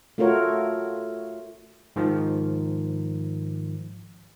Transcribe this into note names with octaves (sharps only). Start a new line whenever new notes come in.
A3 F4 F#4 A#4 C#5
G#2 D#3 F3